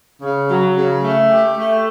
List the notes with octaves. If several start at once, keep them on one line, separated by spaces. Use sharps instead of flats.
C#3
F#3
C#3
A3
G4
A3